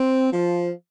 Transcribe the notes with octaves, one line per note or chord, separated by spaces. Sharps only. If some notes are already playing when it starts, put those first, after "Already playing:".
Already playing: C4
F3